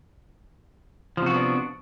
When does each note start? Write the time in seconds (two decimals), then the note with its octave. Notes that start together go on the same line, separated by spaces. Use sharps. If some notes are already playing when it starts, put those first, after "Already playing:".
1.17 F3
1.22 C3
1.26 F#4
1.31 B3
1.35 D4